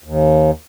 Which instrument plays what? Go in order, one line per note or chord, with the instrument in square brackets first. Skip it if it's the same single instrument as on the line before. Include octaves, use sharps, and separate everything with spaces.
[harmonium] D#2